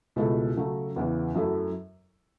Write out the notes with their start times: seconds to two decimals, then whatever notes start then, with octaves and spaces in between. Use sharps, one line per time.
0.16 C#2 B2 A3 E4 A4
0.56 C#3 F#3 A3
0.96 E2 C#3 E3
1.35 F#2 F#3 A3 E4 A4